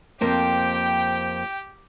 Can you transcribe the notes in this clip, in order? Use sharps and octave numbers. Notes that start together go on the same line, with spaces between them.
F2 A#3 G4 C5 G5